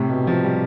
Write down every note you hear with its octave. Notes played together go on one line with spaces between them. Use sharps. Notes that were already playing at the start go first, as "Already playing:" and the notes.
Already playing: A2 C3
B2
F3
G3